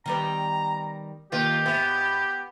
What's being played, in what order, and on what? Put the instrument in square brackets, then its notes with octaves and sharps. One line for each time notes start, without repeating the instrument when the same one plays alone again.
[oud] D#3 G3 B3 [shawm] A#5
[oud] D#3 A#3 B4 [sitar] F4 [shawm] G4
[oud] G#2 E5 [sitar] B3